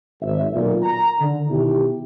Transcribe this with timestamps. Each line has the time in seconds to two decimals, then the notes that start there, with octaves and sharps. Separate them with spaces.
0.21 G#1 E5
0.52 B1 A#2
0.82 A#5
1.19 D3
1.47 B2 D#3 E4 G4